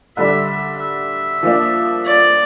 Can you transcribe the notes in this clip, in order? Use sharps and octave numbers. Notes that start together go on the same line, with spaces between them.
D3 G3 D4 E5
E5
E5
F3 A#3 D4
D5